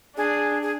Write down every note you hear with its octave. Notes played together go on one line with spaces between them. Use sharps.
D4 G#4
G#4